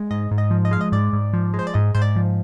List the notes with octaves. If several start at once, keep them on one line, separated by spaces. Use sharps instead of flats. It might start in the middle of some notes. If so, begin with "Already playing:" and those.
Already playing: G#3
G#2 D#5
G#2
D#5
F3
D#5
G#3 F5
D#5
G#2 D5
G#2
F3
G#3
C5
D5
G#2 D#5
G#2 C5
D5
F3